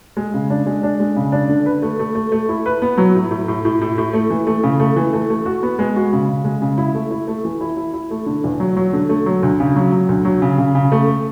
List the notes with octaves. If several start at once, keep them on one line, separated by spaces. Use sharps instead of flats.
G#3
C#3
D4
G#3
D4
G#3
C#3
D4
D3
B4
A3
A3
A3
A3
E4
B4
B3
F#3
A2
A2
A2
A2
A2
A2
A3
E3
A3
C#3
A3
E3
A3
A3
F#4
B3
G#3
F#4
C#3
C#3
G#3
C#3
E4
A3
E4
A3
E3
E4
E4
E4
A3
D3
E2
F#3
F#3
D3
A3
F#3
D2
C#3
F#3
F#3
D2
F#3
C#3
C#3
C#3
A3